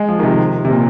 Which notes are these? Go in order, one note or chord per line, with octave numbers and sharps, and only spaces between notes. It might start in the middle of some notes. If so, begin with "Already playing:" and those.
Already playing: G#3
F3
D#3
C3
C3
A#2